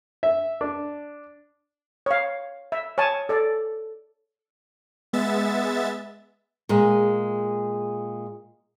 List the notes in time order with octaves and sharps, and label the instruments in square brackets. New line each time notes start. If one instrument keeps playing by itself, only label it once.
[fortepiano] E5
D4
[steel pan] C#5 F5
E5
C#5 G#5 A5
A4 D5
[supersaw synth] G#3 B3 E5 A6
[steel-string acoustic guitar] A#2 G#3